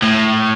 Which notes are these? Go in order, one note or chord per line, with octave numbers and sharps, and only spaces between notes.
A2